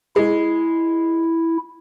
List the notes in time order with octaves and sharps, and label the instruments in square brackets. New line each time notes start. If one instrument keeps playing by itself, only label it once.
[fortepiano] G#3 [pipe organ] E4